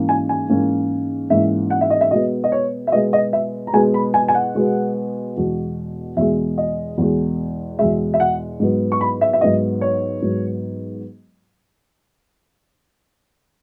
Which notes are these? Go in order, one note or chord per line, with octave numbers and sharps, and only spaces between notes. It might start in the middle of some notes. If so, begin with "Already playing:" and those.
Already playing: G#2 E3 A#3 C#4
G#5
G#5
G#2 E3 A#3 C#4
G#2 E3 A#3 C#4 E5
F#5
E5
D#5
E5
B2 G#3 B3 D#5
D#5
C#5
E5
B2 G#3 B3 D#5
D#5
E5
A#5
B2 G#3 B3 G#5
B5
G#5
G#5
F#5
B2 G#3 B3
E2 B2 G#3
E2 B2 G#3 E5
D#5
E2 B2 G#3
E2 B2 G#3 E5
E5
F#5
G#2 F#3 B3
C#6
B5
E5
E5
G#2 F#3 B3 D#5
C#5
G#2 F#3 B3